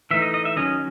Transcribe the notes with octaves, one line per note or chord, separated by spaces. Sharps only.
E3 A3 D#4 E5
D#5
D#5
E5
D#3 F#3 C#4 D#5